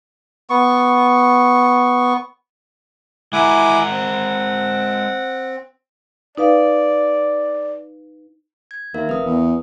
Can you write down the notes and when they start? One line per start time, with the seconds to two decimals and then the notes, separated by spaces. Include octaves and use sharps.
0.50 B3 C#6
3.33 G#3 E4 A#4 F#5 G#5 D6
3.91 C4
6.37 D#4 B4 D5 F5
8.71 G#6
8.94 D#2 A#4 E5 F5
9.09 F1 B4 D#6
9.26 E2